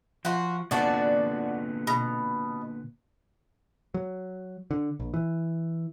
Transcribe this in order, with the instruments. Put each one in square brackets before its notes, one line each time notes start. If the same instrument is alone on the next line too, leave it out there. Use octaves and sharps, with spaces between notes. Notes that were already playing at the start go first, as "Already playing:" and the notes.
[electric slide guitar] F3 [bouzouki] F4 F#4
[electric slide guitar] A#2 D3 B3 [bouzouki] D4 F#4 D5
[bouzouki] B2
[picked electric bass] F#3
D3
A#1
E3